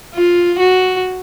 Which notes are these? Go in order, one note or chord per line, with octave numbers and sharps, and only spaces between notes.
F4
F#4